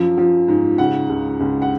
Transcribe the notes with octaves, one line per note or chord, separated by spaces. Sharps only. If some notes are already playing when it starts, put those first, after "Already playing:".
Already playing: F#2 F3
F3
G#2
C#3 F#5
C#2
C#2
F#5